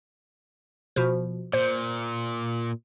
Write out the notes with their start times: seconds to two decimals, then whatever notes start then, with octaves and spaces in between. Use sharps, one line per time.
0.96 B2 F3
1.53 A#2 C5